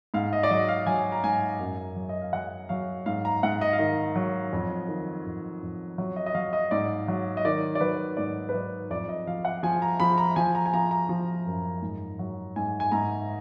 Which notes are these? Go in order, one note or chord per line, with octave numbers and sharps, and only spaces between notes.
G#2 F5
D#5
D5
F#3 D#5
F5
F#3 G#5
A#5
G#2 G#5
F#2
F#3
D#5
F5
F#3 F#5
F#3 F5
G#2 F5
A#5
G#2 F#5
D#5
F5
D#3 D#5
F#3
F2
D#3
F2
F2
F#3
D#5
D#5
F#3 F5
D#5
G#2 D5
F#3
D#5
D#3 D5
D5
F#3 B4
G#2 D5
B4
F#3 D5
F2 D5
D#5
F3 F5
F#5
F3 G#5
A#5
F3 B5
A#5
F3 G#5
A#5
G#5
F3 A#5
A#5
F3
F#2
G#2
F#3
G#2 G#5
G#5
G#2 A#5